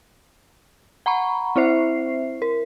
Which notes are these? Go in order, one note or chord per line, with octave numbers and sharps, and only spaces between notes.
F#5 A#5 B5 C#6
C4 E4 C5 E5 C7
A#4